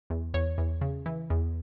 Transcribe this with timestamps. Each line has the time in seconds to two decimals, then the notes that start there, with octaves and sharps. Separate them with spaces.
0.10 E2
0.34 E2 C#5
0.58 E2
0.81 C#3
1.06 E3
1.30 E2